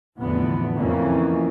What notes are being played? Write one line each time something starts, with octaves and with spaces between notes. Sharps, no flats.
F1 E2 A2 D3 B3
F2 E3 A#3 C#4